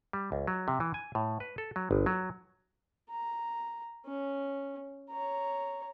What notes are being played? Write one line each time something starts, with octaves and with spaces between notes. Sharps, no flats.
G3
C#2
F#3
C3
E3
G#5
A2
B4
A4
F#3
G1
F#3
A#5
C#4
C#5 A#5